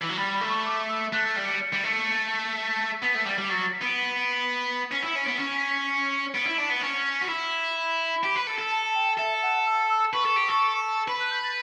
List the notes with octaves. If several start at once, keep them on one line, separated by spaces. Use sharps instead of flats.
E3
F#3
G3 B5
B5
A3
C#6
D6
E6
A3 F#6
A6
G3
C#7
G3
A3
B6
B3
A3
G3
G3
F#3 A6
A6
B6
B3 D7
B6
B6
D7
B6
C#4 B6
E4 C#7
C#4
B3 D7
C#4 C#7
B6
B6
C#7
B3 D7
E4
D4 B6
B3
C#4
F#4
E4
B5
G4
B4
A4
A4
A5
G5
A4 E5
F#5
E6
E6
B4 C#6
A4
G4
A4
B4 B5
F#6
G6
A6